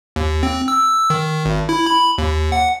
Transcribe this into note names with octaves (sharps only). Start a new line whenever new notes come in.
D#2
C4
E6
D#3
G#1
E4
B5
D#2
F#5